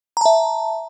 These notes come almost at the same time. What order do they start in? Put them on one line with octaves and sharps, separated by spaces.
A#5 A5 E5